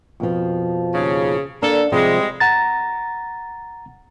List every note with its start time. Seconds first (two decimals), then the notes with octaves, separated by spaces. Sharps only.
0.20 F2 B2 F3
0.95 D#2 C#3
1.62 A#3 D4 A4
1.92 C3 F3 G3 G#3
2.40 F#5 A#5 A6